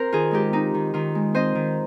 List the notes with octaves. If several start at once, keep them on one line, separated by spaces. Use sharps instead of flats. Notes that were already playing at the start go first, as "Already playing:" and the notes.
Already playing: C4 A#4 C5
D#3 F4 G#4
G#3 D#4 G4
C4 D#4
D#3
D#3 F4
G#3
C4 C5 D#5
D#3